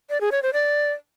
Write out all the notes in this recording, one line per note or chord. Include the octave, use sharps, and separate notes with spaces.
D5
G#4
C#5
C5
D5